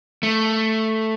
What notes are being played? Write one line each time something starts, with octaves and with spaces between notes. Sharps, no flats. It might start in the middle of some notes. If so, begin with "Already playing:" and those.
A3